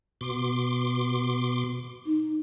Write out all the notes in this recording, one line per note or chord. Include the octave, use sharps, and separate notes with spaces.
B2 C6 D6
D#4